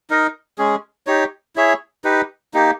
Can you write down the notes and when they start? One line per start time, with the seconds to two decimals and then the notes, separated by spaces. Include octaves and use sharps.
0.10 D#4 A#4 D#5
0.58 G#3 C#4 G#4
1.07 D#4 G4 C#5
1.56 E4 G#4 C#5 E5
2.04 D#4 G4 B4
2.54 A#3 D#4 G4